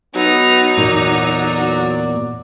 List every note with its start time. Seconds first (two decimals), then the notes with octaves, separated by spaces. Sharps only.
0.15 F#3 B3 D#4
0.77 E2 A#2 D5